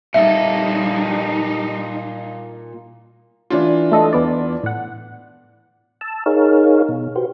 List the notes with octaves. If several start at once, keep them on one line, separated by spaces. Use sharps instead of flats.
A#2 G3 D#4 A4 E5
E3 D4 F4
A3 A4 D#5
E2 B3 D5
A2 F#5
A5 E6
D#4 G#4 A#4 C#5 F5
B2
F#4 G4 B4 C5